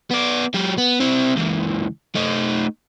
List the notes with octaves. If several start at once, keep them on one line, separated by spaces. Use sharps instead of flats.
B3 D5
F#3 G4
B3
C4 E4
C#2 E3
A3 D#4